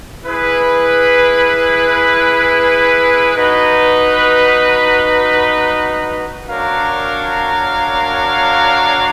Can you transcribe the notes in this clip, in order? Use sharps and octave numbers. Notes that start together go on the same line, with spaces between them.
E4 G#4 B4
D#4 F#4 B4
D4 F#4 A#4 C#5 F5